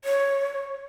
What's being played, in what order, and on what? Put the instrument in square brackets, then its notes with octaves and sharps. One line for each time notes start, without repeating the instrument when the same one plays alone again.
[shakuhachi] C#5